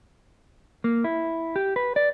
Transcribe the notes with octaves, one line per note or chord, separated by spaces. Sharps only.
A#3
E4
G4
B4
D5